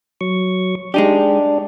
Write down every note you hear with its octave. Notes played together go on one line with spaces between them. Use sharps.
F#3 C#6
G#3 D4 D#4 G4 D5